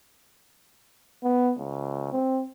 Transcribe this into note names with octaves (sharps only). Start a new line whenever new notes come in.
B3
C#2
C4